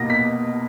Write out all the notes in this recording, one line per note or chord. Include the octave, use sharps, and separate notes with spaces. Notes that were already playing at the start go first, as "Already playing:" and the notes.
Already playing: B2 A#3 D#4 A#6
B6